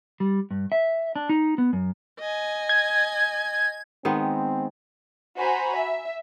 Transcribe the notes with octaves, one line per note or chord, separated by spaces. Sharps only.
G3
G2
E5
D4
D#4
B3
F#2
D#5 G#5
G#6
D#3 G#3 B3 C4
F#4 C5 G#5 A#5 B5
E5